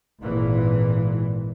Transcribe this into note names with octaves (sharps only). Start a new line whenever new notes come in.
G#1 A#2 E3